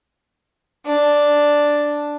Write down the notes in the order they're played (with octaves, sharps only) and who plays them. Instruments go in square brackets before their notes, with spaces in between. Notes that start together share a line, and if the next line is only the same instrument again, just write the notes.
[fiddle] D4